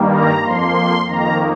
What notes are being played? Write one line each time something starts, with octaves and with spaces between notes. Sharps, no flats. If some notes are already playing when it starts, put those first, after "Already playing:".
Already playing: G2 D#3 G3 A#3
A#5
F2 F3 A#3 C6
F2 D#3 A#3 A#5